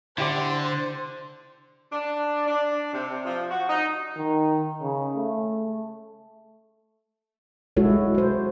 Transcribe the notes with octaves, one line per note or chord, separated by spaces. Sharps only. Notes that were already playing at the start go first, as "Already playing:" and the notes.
D3 E4 G4 C5 D5
D4
D4
C3
F3
F#4
D#4
D#3
C#3
A3
G#3 E4 F#4 A4 C#5
F#4 C5